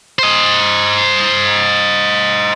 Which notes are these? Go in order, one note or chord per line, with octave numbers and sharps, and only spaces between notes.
C5 D#5